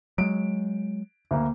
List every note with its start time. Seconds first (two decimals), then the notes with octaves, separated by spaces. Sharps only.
0.18 F#3 G#3 D7
1.31 D2 A#3